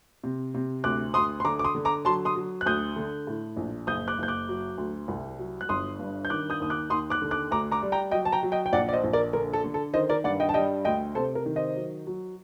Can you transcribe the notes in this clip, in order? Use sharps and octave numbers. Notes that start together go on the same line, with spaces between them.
C3
C3
D2 D6 F#6
D2 C6 D#6
C6
D3 A#5 D6
D6
C6 D#6
D3
A#5 D6
F#3 A5 C6
C6 D#6
F#3
F#6
D2 D#6 G6
D3
A2
A#1
F#1 D#6 G6
D6 F#6
F#1 G6
D6 F#6
F#3
D2
C2
F#3
F#6
G1 C6 D#6
G2
G6
D#3 D6 F#6
D#6 G6
D#2 D#6
D6 F#6
D#2 C6 D#6
D6 F#6
D3
D6 F#6
D2 A#5 D6
A#5 D6
G3
G5 A#5
F#3 D#5 G5
A5
G5 A#5
F#3
D#5 G5
G5
A#1 D5 F#5
D5
C5 D#5
A#1
A#4 D5
D3 A#4
A4
D3
A4
D#3 C5 D#5
A#4 D5
G2 D5 F#5
D#5 G5
A5
G3 D#5 G5
D2 D#5 G5
C3 A4 C5
A#4
D#3
C5 D#5
F#3
F#3